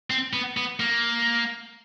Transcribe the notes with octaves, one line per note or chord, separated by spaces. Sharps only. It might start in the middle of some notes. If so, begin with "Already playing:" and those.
C4
B3
B3
A#3